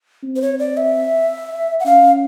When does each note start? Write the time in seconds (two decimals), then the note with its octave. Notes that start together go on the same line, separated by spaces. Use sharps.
0.23 C4
0.36 C5
0.42 C#5
0.59 D5
0.77 E5
1.80 F#5
1.86 C#4 F5